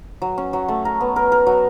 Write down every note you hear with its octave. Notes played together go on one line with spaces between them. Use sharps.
F#3
C#4
F#3
A3
A#4
B3
A#4
A#4
F#3